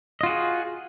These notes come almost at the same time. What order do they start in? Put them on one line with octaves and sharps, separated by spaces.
D#5 F4 F#4 G#4